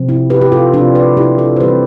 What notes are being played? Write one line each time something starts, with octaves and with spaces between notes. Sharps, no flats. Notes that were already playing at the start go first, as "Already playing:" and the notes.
Already playing: C3 F3 C4
E4
G4 B4
G4
F4 A4
C3 F3 C4 D4 F4
B4 D5
E4 G4
F4 A4
C5
E3 G3 C4 G4 B4